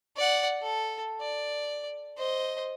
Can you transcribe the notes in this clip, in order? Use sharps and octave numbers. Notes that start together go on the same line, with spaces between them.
D5 F#5
A4
D5
C5 D#5